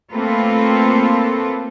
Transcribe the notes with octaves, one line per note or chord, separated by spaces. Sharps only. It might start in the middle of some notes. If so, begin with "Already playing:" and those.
A3 A#3 C4 F4 A4 B4